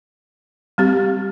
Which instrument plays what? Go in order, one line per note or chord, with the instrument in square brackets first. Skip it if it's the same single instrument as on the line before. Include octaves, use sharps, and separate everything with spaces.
[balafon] G3 C4 G4